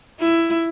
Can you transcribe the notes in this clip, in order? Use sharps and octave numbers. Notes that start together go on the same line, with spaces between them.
E4